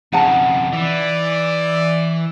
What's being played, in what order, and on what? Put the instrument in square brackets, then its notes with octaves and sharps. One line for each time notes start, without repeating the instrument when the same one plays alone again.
[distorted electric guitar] F2 C#3 [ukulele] D#4 F#5 A5
[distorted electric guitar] E3 [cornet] D5